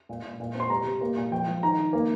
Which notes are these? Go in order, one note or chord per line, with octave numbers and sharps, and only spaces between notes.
A#2
A#2
A#2
C4 C6
C3 A#5
C3
A#3
A#2
F3 G5
F3
D#3 A#5
D#3
A#3